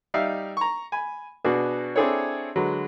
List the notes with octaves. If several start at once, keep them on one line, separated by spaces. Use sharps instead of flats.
G3 D#4 D5 E5 F5
A#5 C#6
G#5 B5
B2 B3 D4 F#4 G#4
C4 D4 E4 G#4 A4 C#5
D3 F#3 G#3 B4